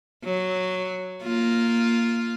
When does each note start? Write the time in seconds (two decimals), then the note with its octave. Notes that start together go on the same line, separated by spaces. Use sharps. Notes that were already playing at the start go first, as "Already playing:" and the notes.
0.24 F#3
1.23 A#3 F4